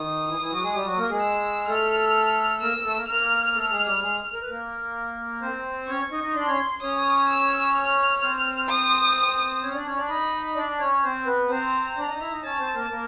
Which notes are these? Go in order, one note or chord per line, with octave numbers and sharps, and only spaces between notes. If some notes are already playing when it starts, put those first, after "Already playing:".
Already playing: D#3 D#4 D#6
E3 E4
E3 E4
F#3 F#4
G#3 G#4
G3 G4
F#3 F#4
A#3 A#4
G#3 G#4
E6
A3 A4 F6
A#3 A#4 E6
A3 A4
A#3 A#4
A#3 A#4 F6
A3 A4
G#3 G#4
G3 G4
G#3 G#4
A#4
B4
A#3 A#4
C4 C5
C#4 C#5 C#6
D#4 D#5
D#4 D#5
D4 D5 C6
C#4 C#5
C#4 C#5 D#6
E6
F6
C4 C5
D#6
C#4 C#5
D4 D5
C#4 C#5
D4 D5
D#4 D#5 B5
D4 D5
C#4 C#5
C4 C5
B3 B4
C4 C5 A#5
D4 D5
D#4 D#5
E4 E5
D#4 D#5
C#4 C#5 A5
C4 C5
A#3 A#4
A#3 A#4